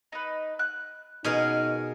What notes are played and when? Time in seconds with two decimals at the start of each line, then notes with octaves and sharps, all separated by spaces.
0.12 D#4 B4
0.59 F#6
1.24 B2 C#4 D#4 G#4 A#4